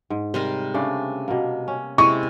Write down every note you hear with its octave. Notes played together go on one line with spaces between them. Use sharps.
G#2
C3 G3 A#4 C5
C#3 A3 D4
B2 A#3
C#4
C3 G#3 E4 C#6